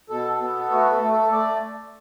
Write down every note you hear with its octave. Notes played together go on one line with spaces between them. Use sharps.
B2 A4
B3
A3 F#4
A4
A3
A4
A3 D5